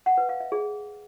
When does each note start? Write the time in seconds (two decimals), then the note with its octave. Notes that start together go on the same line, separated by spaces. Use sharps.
0.06 F#5
0.18 B4
0.29 F5
0.40 E5
0.52 G#4